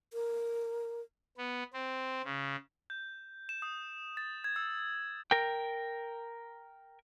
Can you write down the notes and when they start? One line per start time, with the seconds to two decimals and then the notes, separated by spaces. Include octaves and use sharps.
0.13 A#4
1.37 B3
1.73 C4
2.24 C#3
2.90 G6
3.49 E7
3.62 D#6
4.17 A6
4.44 G#6
4.56 E6
5.31 A#4 G5